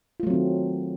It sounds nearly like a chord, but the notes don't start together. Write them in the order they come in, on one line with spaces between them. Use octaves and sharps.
F4 A3 F#3 C4 D#3